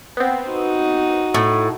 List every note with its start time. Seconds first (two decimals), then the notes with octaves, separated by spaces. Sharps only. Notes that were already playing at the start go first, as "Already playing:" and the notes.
0.17 B3 C4
0.49 D#4 F#4
1.34 A2